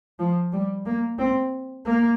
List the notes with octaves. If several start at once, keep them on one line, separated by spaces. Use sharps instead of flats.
F3
G3
A#3
C4
A#3